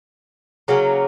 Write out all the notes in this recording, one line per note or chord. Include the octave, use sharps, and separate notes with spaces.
C#3 F#3 A#3 C#4